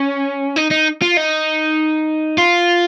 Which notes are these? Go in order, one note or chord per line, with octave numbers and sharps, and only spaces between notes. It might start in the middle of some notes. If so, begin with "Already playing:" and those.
Already playing: C#4
D#4
D#4
F4
D#4
F4